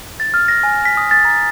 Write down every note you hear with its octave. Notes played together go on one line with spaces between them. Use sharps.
A6
F6
A#6
G#5
B6
D#6
A6
A#5